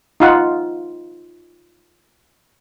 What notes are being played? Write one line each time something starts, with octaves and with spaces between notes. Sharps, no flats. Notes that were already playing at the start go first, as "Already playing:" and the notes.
D#4 F4 F#5